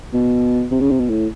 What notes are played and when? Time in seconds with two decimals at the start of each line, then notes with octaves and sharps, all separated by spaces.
0.13 B2
0.71 C3
0.80 C#3
0.90 C3
1.00 B2
1.10 A2